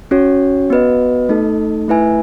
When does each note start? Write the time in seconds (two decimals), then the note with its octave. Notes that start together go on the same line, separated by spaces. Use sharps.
0.11 C#4 F#4 C#5
0.70 B3 F#4 B4 D#5
1.29 A3 D#4 A4
1.88 A3 E4 B4 E5 G#5